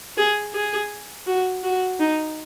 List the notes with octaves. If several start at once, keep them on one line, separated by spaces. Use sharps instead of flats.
G#4
G#4
F#4
F#4
D#4